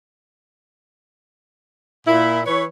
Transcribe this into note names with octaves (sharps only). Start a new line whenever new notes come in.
A#2 E4
E3 B4 C#5